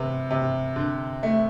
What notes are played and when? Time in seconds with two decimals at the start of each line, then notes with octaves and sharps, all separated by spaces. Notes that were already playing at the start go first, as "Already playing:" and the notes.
Already playing: C3 B3
0.31 C3
0.76 D3
1.23 A3